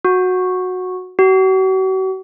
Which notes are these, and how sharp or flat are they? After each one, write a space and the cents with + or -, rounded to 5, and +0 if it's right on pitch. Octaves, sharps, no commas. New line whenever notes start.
F#4 -10
F#4 +40